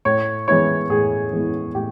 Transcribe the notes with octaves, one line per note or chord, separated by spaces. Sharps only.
A2 C#5
E3 G#3 B3 E4 C#5
A2 G#4
E3 G#3 B3 E4
A2 G4